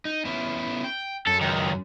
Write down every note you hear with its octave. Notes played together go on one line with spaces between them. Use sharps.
D#4
B3 C#4 E4
G5
F#2 A4
C#2 D#3